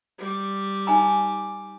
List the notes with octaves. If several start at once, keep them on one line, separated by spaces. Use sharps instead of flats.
G3 D6
D#4 G#5 A#5